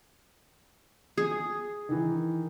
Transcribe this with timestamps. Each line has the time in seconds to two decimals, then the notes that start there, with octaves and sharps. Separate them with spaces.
1.18 G#4
1.89 D#3 E3